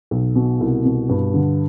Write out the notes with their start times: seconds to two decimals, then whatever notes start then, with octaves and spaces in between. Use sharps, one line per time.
0.11 B1
0.36 B2
0.61 C2
0.85 B2
1.09 G2
1.34 D3